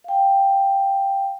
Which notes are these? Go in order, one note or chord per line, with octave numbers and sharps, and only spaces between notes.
F5 G5